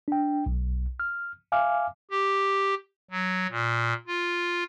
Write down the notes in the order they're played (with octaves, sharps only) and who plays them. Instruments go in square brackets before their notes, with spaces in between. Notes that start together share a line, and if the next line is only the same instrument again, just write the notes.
[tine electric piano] D4 G5
B1
F6
E5 F5 G#5 D6 F6
[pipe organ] G4
F#3
A#2
F4